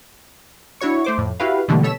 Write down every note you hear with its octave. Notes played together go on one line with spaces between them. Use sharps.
D4 E4 F#4 C#5 C#6
A3 C5 D6
F2 A2
E4 F#4 G4 B4 F5
B2 D3 E3 G3 A3 A#3
B2 A4 C#5 B6 E7